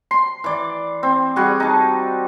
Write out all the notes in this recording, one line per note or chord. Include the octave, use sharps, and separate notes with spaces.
C6
E3 D5
C4
G3 F#4 G#4
D#4 A5